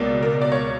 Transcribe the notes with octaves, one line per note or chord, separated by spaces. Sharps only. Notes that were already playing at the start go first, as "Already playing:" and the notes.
Already playing: C#2 B2 A#3 D5
A#4
D5
C#5